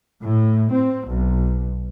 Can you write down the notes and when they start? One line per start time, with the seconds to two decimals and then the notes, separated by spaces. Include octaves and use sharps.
0.24 A2
0.71 C4
1.08 B1